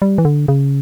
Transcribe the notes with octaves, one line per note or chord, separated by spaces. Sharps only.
G3
E3
D3
C#3